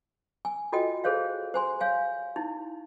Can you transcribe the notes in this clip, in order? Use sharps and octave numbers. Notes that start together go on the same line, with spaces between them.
G#5
F4 F#4 A4 D#5 G5
G#4 A4 C5 C#5 F5
C5 G#5 C6
C#5 F5 G#5
D#4 E4